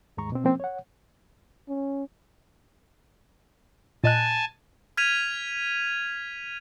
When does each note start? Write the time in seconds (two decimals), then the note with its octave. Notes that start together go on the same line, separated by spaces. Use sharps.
0.17 D#2 G#2 G#3 A#5 C#6
0.32 B2 C4
0.44 F3 A#3 C4 C#4
0.60 C#5 F#5
1.69 C#4
4.04 A#2 D#5 G#5 A5 F#6
4.97 F6 G#6 B6 D#7 F7